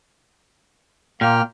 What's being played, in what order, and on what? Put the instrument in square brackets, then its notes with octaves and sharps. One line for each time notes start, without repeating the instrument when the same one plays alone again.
[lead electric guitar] A#2 [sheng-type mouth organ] A#3 G5 F6